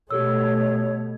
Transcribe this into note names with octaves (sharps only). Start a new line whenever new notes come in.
B2 A3 G4 A4 C#5 E6